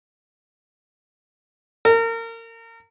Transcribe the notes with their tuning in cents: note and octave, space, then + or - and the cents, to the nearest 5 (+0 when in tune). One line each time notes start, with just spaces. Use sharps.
A#4 -30